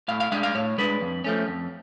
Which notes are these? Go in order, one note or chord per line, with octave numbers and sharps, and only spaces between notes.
A2 F5
F5
G#3 D4 F5
F5
A2 C#5
G#3 D4 B4
F2
F3 A3 C#4
F2